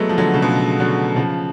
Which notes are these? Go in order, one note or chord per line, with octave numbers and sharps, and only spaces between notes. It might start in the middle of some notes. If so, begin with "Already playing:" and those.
Already playing: F#3 G#3 A3 B3
F3
D3 F#3
C#3
B2 D3
D3 F#3
C#3 F3